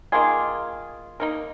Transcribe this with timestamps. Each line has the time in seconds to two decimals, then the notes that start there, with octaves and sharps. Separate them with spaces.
0.12 D#3 A#3 F4 G#4
1.20 A#3 D#4 A#4